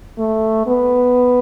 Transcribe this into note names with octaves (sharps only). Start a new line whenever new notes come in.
A3
B3